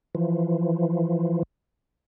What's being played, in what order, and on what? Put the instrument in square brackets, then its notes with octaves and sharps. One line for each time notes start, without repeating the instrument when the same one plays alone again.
[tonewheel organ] E3 F3